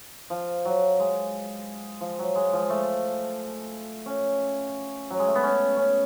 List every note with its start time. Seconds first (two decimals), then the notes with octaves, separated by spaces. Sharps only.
0.30 F3
0.65 F#3
1.00 G#3
2.01 F3
2.19 F#3
2.35 G#3
2.53 F3
2.70 A3
4.06 C#4
5.10 F#3
5.19 G#3
5.28 A3
5.35 B3
5.43 C#4
5.77 C#4